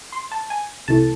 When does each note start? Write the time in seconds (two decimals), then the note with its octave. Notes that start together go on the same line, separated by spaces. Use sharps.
0.12 C6
0.32 A5
0.50 G#5
0.88 C2 C3 E3 A3 A5